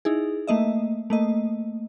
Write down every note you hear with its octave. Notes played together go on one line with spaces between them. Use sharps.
D#4 E4 G#4
A3 A#3 D#5 E5
A3 A#3 D#5